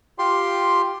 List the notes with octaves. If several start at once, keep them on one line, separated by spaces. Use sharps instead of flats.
F4 G4 C6